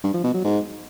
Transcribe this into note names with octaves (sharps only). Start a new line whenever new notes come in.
G2
F3
B2
F#3
G#2